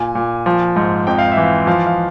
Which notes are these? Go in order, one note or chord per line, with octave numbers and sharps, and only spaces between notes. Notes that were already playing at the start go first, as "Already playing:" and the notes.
Already playing: A#2 G#5
A#2
F3
G#2
F2 G5
F5
E5
E3
F5
F3 F5
F5